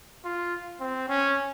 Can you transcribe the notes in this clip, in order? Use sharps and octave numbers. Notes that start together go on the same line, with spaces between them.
F4
C4
C#4